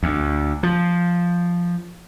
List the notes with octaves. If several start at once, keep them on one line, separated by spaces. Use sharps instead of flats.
D2
F3